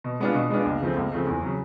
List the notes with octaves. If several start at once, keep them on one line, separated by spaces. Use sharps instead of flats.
B2
G#3 B3 D4 F4
B2
G#3 B3 D4 F4
C#2
C#3 F3 A3 C4
C#2
C#3 F3 A3 C4
E2
C#3 F#3